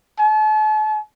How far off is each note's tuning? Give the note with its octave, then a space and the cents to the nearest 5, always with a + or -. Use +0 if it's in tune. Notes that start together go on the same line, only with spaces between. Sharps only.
A5 -40